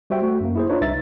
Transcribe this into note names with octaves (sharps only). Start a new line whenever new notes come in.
G3 F#4 C5 E5 G5
A3 F#4
F#2 A#3
E4 G#4 C5
D4 D#4 F4 B4 C#5
C2 D#4 E5 A6